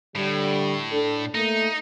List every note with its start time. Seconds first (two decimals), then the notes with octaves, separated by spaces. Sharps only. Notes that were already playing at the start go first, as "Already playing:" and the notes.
0.15 A2 D3 G3
0.92 D4 A4
1.35 A3 A#3 D#4